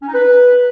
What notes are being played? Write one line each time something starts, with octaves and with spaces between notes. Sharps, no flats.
C#4
D#4
B4